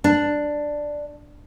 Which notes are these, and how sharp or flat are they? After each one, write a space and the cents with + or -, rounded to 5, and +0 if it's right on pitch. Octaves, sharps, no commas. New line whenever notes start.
D4 +5